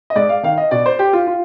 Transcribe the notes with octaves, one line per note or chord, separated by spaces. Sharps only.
D#5
G#2 D5
F5
D#3 F5
D#5
B2 D5
C5
G4
F4
F4